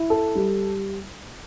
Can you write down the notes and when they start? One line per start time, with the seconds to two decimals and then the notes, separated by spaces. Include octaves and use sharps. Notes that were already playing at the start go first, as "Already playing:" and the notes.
Already playing: E4
0.10 A4
0.35 G3